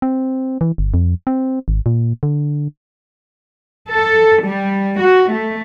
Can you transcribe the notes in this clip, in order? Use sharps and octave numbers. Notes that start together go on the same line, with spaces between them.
C4
E3
G1
F2
C4
G#1
A#2
D3
A4
G3
F#4
A3